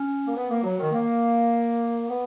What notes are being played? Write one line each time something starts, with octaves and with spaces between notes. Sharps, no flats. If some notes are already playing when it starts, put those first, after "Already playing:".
Already playing: C#4
A#3
B3
A#3
F#3
D#3
A#3
B3